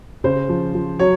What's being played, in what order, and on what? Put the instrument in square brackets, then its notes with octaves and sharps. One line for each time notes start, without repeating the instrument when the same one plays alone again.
[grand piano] C#3 C5
F3
F3
F#3 C#5